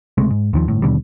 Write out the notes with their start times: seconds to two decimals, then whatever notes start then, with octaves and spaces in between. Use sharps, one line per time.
0.18 C#2 C3 G#3 A3
0.30 G#2
0.53 D#2 D#3 F3
0.68 G1 A2
0.82 D#2 B2 D3 G3